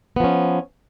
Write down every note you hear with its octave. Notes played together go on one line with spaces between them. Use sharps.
F3 B3 C#4